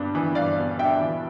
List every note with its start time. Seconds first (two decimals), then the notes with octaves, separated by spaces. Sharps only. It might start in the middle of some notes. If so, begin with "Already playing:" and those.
Already playing: G2 B3 D4
0.15 E3
0.35 G2 D5 F5
0.58 B3
0.79 D4 E5 G5
1.00 E3